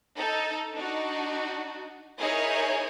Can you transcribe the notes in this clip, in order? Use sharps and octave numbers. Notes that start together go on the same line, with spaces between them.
D#4 A4
D4 D#4 F#4
D#4 E4 G#4 A#4 C#5 D#5